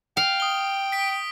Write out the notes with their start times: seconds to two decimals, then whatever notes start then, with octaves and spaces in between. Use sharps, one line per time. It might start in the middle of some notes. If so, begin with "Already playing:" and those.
0.17 F5 G5
0.40 D#6 G7
0.92 B6 D7